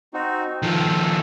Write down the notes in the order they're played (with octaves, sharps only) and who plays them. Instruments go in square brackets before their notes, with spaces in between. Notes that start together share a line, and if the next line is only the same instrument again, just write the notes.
[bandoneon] C4 D#4 F#4
[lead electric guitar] D#3 F3 [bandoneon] A4